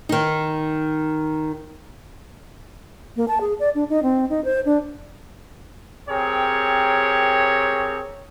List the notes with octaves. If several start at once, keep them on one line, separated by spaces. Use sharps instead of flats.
D#3 D#4
A#3
A5
G#4
D5
D4
D#4
C4
D#4
C5
D4
C4 G4 G#4 A#4 C#5